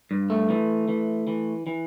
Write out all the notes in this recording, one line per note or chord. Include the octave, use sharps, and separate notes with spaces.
G2
A3
E3
E3
E3
E3